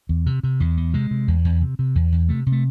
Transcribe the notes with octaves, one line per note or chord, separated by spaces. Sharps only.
E2
C3
C3
E2
E2
C3 G#3
C3
E2
E2
C3
C3
E2
E2
C3 A3
C3
A3